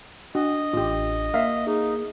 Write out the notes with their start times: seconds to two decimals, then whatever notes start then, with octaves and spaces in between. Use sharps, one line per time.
0.35 D4 F#4 D#5
0.73 A1 F4 G4
1.34 A#3 E5 F5
1.67 D#4 G#4